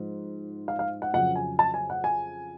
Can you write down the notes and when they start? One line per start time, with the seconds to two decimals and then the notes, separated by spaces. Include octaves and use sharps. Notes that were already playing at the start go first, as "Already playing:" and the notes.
Already playing: G#2 F3
0.68 F5
0.79 F5
1.02 F#5
1.13 F2 C#3 F#3 C#4 F#5
1.36 G#5
1.59 A5
1.74 G#5
1.90 F#5
2.04 G#5